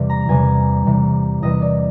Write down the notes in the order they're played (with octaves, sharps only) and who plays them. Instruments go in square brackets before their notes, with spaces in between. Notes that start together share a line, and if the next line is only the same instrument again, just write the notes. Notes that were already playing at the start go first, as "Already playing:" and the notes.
Already playing: [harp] E2 C3 E3 G3
A#5
E2 C3 E3 G3 G#5
E2 C3 E3 G3
E2 C3 E3 G3 D#5
D5